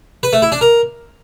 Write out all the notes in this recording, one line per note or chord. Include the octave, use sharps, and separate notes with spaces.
B4
A3
E4
D4
A#4